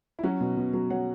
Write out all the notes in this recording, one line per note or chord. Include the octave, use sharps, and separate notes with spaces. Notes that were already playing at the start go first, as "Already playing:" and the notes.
E4
F#3 C#4 F#4
B2
B2
F#3
F#3 C#5 F#5